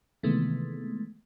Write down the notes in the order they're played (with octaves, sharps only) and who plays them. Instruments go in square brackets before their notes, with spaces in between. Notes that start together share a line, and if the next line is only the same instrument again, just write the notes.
[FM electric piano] C3 D#3 E3 G#3 A3 B3